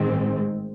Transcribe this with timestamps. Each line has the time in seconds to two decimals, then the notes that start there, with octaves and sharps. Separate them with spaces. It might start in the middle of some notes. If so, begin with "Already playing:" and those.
Already playing: A1 G#2 D#3 G#3 C4